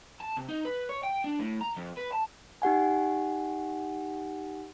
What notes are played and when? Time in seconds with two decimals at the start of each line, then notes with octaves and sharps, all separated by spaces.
0.21 A5
0.37 C3
0.49 D#4
0.65 B4
0.89 C#5
1.03 G5
1.25 D4
1.40 A2
1.61 A#5
1.76 F2
1.97 B4
2.12 A5
2.62 D#4 G4 F#5 G#5